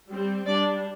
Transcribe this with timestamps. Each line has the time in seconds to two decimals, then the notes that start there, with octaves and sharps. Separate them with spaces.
0.09 G3 C4
0.46 G3 D4 D5